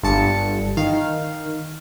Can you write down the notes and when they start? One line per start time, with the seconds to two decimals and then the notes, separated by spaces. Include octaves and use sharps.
0.03 G1 G2 A5 C#7
0.77 D#3 F5